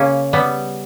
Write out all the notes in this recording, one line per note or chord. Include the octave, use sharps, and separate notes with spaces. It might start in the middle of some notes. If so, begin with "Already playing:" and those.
Already playing: C#3 A#3 C#4
G3 B3